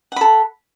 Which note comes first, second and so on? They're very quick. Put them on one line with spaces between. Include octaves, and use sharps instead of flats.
F#5 B5 A4